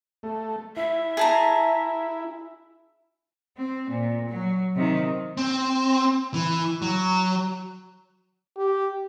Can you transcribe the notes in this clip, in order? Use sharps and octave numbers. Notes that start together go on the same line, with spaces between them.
A3
E4 E5
G#4 A5 A#5
C4
A#2
F#3
C3 D#3
C4
E3
F#3
G4